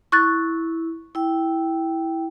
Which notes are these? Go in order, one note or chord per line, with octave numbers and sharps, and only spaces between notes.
E4 C#6 F#6 A6
E4 G5